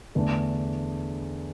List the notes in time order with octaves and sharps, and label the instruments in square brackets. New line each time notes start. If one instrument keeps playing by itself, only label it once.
[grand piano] E2 D3 A3 D4